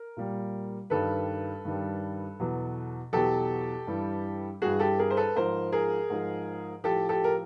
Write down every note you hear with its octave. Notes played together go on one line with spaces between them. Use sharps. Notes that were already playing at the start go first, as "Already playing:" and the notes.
Already playing: A#4
A#2 G3
G2 D#3 G3 A4 B4
G2 D#3 G3
E2 B2 F#3
E2 B2 F#3 G4 A4
G2 E3 G3
G2 E3 G3 F#4 G#4
G4 A4
G#4 A#4
C5
A4 B4
G#2 F3 A#4 C5
G#4 A#4
G#2 F3
A2 F3 G4 A4
G4 A4
A#4